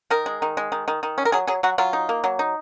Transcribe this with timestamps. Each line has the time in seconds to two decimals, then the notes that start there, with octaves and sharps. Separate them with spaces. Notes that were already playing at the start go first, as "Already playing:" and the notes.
0.10 D#3 A#4
0.26 G#3
0.42 D#3
0.57 G#3
0.72 D#3
0.88 D#3
1.03 D#3
1.18 C#4
1.25 A#4
1.32 F#3 G#4
1.47 F#3 G#4
1.63 F#3 F#4
1.78 F#3 F4
1.93 D#4
2.09 A#3
2.24 F#3
2.39 D#4